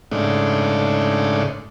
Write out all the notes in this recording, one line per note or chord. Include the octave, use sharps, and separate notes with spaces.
G#2 C#3 A3 D4 D#4